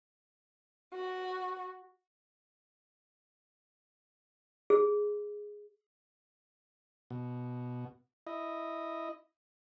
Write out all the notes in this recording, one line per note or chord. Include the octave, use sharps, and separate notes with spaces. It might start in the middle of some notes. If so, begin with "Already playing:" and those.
F#4
G#4
B2
E4 D#5